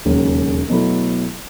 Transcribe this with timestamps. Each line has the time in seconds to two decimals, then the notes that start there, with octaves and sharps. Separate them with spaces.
0.05 E1 D#2 C#3 F#3 C#4
0.70 B2 F#3 A3 E4 A4